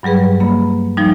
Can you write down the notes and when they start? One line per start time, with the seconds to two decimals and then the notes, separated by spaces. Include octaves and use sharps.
0.03 G2 F#3 G3 G#4 B4
0.40 A#3 B5
0.97 F3 G3 D#4